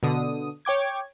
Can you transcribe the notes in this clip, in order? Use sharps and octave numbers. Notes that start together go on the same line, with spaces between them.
B2 D3 D#6
C#5 G5 D6 G#6